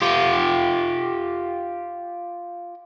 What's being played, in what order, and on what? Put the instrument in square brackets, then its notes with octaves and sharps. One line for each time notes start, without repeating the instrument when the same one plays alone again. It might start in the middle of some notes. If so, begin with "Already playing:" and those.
[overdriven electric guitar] F4 G4